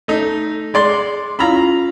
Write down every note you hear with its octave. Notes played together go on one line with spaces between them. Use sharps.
A3 D#4
G#3 D5 C6
C#4 E4 F4 F5 A#5 B5